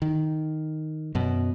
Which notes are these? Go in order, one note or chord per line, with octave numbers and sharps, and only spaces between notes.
D#3
F#2 B2